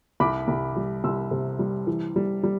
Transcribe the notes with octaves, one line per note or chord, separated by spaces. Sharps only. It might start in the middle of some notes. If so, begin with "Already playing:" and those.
C2 B5 D6
C2
G3
C2 C6 E6
C3
G3
E3
G3
G3